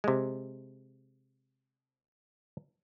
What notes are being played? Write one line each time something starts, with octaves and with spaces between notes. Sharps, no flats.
C3 G#3